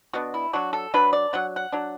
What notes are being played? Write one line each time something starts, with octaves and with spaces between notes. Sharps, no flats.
B2 B3 D4 F#4
E4
F#3 D4 F#4
A4
F#3 D4 B4
D5
F#3 D4 F#5
F#5
F#3 D4